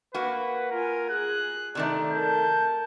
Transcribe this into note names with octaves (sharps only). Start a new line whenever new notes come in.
A#3 F#4 B4
F4 A#4 G#5
G#4 F#6
C3 D#3 A3 D5 A#5
A#4 A5 G6